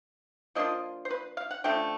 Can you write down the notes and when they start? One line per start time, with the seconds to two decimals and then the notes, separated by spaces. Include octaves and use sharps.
0.55 F3 A#3 D4 F4 D#5
1.05 C5
1.11 B4
1.37 F5
1.51 F#5
1.64 D3 F3 A3 C#4 G5